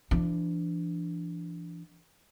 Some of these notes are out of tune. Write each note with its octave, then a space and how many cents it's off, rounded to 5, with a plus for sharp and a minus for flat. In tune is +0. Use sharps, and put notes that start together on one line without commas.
E3 +40 D4 +0